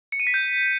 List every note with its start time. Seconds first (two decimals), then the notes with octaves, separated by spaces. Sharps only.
0.12 C#7
0.20 D#7
0.27 B6
0.34 G6